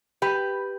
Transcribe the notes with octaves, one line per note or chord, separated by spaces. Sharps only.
G4 B4